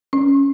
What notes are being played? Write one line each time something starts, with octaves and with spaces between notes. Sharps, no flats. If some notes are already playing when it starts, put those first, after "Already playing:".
C#4